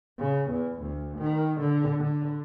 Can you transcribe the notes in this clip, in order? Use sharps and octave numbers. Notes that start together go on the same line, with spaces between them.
C#3
E2
D2
D#3
D3
D3